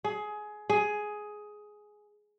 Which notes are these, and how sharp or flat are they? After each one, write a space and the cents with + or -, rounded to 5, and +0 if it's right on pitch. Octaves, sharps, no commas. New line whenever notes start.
G#4 +20
G#4 +10